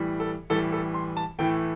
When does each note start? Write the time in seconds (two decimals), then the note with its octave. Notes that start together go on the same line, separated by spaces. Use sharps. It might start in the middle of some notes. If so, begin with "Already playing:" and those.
Already playing: A2 E3 G3
0.20 A4
0.50 A2 E3 G3 A4
0.72 A4
0.94 C6
1.17 A5
1.39 A2 E3 A3 G5